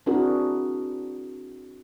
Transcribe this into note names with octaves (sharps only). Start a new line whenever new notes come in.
C4 D4 E4 F#4 G#4 A#4